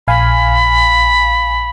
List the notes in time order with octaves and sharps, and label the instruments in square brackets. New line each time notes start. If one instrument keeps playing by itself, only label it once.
[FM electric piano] A#1 F5 G#5 [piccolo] B5